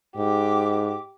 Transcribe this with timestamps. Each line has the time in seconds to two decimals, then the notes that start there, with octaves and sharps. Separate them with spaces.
0.17 G#2 G4 D6